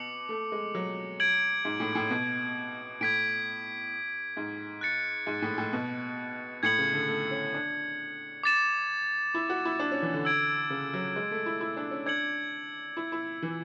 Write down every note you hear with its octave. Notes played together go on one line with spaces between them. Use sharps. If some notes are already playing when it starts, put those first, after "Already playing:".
Already playing: B2 D6 C#7 F#7
A3
G#3
F#3
G#6 D7 F#7
G#2
A2
A2
B2
A2 G#6 B6 D7
G#2
F#6 A6 C#7
G#2
A2
A2
B2
A2 G#6 C#7 F#7
C#3
D3
A3
C#4
D4
D6 A6 E7
E4
F#4
E4
D4
C#4
E3
D3
E6 G#6 D7
C#3
F#3
G#3
A3
E4
E4
D4
C#4
D4 G#6 C#7 F#7
E4
E4
E3